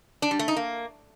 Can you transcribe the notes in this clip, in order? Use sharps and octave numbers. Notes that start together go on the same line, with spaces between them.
D4
G3
A3
D#4
A#3